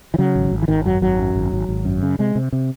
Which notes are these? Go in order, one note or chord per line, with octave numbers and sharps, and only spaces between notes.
E3
C#3 F#3
G#1
G#1
E3
G#1 D#3
F#2 F#3
G#1 F#3
F#2
G#1
G#1
G#1
F#2
C#3
C3 G#3
C3
C3